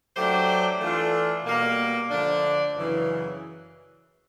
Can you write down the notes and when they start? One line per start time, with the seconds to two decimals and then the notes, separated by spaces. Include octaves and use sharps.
0.14 F#3 A3 D4 G4 C5
0.80 E3 A3 D4 F4 A4
1.45 B2 G3 A#3
2.10 D3 F3 A3 D4
2.76 F#2 C#3 E3